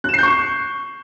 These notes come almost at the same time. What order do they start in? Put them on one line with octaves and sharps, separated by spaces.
F#6 E7 C7 G6 C#6